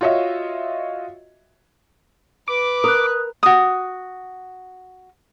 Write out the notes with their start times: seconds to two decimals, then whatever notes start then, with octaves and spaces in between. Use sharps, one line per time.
0.01 F4 F#4 C#5 D#5 E5
2.48 B4 D6
2.84 A#4 D#6 F#6
3.43 F#4 D#6